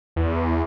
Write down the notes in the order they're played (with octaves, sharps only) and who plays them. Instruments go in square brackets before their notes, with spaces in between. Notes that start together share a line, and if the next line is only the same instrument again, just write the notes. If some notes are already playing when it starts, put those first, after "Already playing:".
[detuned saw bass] E2